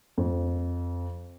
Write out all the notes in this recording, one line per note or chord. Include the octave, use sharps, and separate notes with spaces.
F2